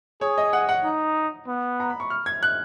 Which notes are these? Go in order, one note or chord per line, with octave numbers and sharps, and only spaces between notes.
G#4 C#5
D#5
F#5
F#5
D#4
B3
A#5
B5
C#6
F6
G#6
F#6